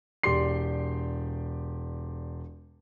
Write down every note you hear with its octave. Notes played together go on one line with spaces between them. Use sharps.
E1 G4 D5 C6 C7